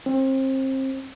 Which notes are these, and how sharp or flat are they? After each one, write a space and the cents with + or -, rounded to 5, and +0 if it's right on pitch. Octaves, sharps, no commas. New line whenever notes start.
C4 +30